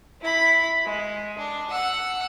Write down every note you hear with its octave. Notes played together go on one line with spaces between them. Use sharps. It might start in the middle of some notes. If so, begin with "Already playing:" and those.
E4 B5
G#3
D4
F#5 E6